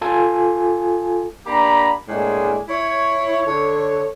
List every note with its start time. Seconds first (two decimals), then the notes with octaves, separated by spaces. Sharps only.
0.02 F4 A4 G#5 A5
1.46 A#3 D4 G4 A#5 B5
2.08 A2 G#3 A#3 D4 G#5
2.69 E4 C#5
3.46 D3 A4 C#5